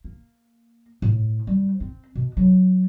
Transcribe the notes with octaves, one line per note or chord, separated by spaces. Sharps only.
A#3
A2
G3
C4
B2
F#3